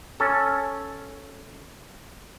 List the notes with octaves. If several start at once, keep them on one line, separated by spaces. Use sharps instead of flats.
C#4 A4